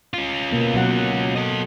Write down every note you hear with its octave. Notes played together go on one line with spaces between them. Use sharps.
C#4 F4
B2 A#3 B3
B2 F#3 F#5
A4 D#5